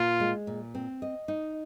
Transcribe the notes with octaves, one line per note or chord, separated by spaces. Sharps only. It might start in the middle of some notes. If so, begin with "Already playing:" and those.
Already playing: A#2 F4
G#3
A#2
C4
D#5
D#4